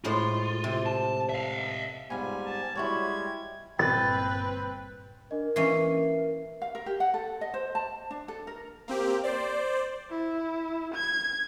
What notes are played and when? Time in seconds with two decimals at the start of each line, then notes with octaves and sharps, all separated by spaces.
0.04 A2 G#3 F4 C5
0.64 C3
0.86 A5
1.29 E5 F5
2.10 G#2 G3 B3 F4 G#5
2.45 A5
2.75 G3 G#3 E4 F#4 C#5 G#6
3.79 G1 A#2 C4 B4 G5 A6
5.31 D4 A#4 D#5
5.56 E3 A#3 C#4 E5 C7
6.62 F5
6.75 A#4
6.86 G4
7.00 F#5
7.14 A4
7.41 D#5
7.54 C5
7.75 A5
8.11 D4
8.28 A4
8.47 A#4
8.88 A#3 C4 G4
9.24 C5 D5
10.11 E4
10.94 G#6